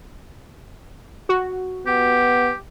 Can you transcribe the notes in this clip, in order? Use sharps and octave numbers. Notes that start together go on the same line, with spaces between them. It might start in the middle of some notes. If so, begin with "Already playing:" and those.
F#4
B3 G4